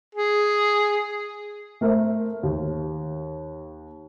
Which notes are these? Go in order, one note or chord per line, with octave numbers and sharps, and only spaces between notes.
G#4
A3 A#4 C5 E5
D#2